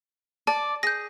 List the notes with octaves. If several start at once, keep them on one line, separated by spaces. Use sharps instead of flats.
D5 A5
G#4 G6 A#6